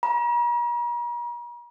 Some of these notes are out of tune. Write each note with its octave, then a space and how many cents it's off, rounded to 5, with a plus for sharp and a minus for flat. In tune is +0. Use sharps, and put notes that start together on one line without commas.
A#5 +45